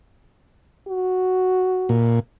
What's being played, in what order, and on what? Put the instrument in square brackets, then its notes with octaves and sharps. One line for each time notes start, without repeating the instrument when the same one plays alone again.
[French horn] F#4
[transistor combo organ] A#2